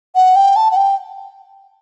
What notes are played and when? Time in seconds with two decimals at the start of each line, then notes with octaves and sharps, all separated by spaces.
0.15 F#5
0.36 G5
0.56 A5
0.71 F#5
0.76 G5